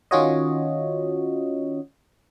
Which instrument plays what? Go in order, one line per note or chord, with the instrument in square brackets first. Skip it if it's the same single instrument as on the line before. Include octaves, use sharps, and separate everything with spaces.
[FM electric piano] D#3 C#4 F4 F#4 C#5 D#5